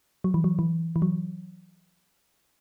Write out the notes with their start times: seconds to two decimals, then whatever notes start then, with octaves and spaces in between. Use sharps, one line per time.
0.24 F#3
0.34 E3
0.44 F#3
0.59 E3
0.96 E3
1.02 F#3